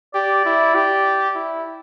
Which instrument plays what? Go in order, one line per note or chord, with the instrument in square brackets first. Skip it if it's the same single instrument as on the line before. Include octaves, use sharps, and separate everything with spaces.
[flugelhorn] G4 [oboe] D5
[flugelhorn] E4
G4
E4